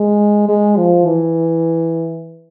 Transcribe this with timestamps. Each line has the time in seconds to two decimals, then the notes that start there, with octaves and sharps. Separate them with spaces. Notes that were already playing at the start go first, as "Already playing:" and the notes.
Already playing: G#3
0.49 G#3
0.77 F3
1.06 E3